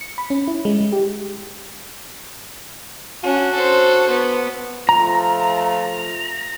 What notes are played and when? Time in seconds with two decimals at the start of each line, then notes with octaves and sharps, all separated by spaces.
0.01 C#7
0.18 B5
0.30 C#4
0.48 E4
0.65 G#3
0.81 G#3
0.92 G4
3.24 C#4 D4 F#4
3.54 A4 C5
4.09 B3
4.89 F3 A3 F4 A#5